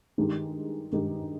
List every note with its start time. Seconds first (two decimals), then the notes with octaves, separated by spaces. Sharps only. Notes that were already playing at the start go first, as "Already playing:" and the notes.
0.18 G2 D#3 G#3 D#4 G4
0.92 G2 D#3 G#3 D#4 G4